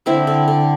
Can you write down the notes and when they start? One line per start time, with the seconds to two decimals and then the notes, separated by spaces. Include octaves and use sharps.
0.06 D3 C4 E4
0.27 D3
0.48 D3